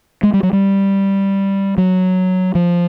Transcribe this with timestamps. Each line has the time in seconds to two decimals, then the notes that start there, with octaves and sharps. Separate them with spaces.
0.23 G#3
0.34 G3
0.43 F#3
0.53 G3
1.78 F#3
2.55 F3